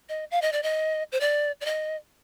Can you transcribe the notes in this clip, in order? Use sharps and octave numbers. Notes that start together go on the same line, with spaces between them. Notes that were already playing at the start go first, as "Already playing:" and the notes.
D#5
F5
D#5
D5
D#5
C5
D5
D5
D#5